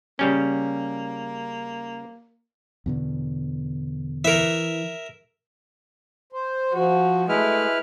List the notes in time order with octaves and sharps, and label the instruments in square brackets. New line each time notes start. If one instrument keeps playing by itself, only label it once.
[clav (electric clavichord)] C#3 G3 C#4 [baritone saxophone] A#3
[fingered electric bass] E2 B2 D3
[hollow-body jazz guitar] E3 [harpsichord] A#4 E5
[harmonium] C5
[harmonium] F3 [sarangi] F#4
[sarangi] G#3 [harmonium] A3 [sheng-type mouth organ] E4 B4 F6